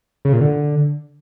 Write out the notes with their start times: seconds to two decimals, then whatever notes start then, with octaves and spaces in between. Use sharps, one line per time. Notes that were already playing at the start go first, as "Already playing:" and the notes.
0.25 C#3
0.33 A#2
0.41 D3